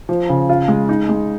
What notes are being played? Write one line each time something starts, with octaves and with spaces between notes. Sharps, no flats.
F3
C#3
F4
G#3
D#4
G#3